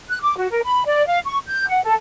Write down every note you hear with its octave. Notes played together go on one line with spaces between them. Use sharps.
F#6
D6
F#4
A#4
B5
D5
F5
C#6
G6
F#5
A4